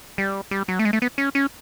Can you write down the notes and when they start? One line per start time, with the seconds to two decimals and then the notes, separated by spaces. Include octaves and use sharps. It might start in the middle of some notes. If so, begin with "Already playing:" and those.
0.18 G3
0.51 G3
0.68 F#3
0.79 A3
0.85 G#3
0.93 A3
1.02 B3
1.18 C#4
1.35 C#4